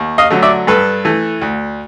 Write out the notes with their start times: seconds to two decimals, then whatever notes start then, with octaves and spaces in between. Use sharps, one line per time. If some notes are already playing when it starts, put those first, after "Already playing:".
Already playing: D#2
0.18 D#5 F5
0.30 D3 F#3 A3
0.42 D5 E5
0.67 G2 A4 B4
1.05 E3 A3
1.41 D2